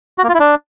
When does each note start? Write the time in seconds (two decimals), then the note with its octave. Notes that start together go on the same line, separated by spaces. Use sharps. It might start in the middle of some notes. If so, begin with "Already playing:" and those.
0.18 F#4
0.23 A#3
0.29 F4
0.34 E4
0.40 D4